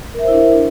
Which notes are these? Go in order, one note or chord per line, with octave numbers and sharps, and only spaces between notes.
D4 E4 A#4 C5 E5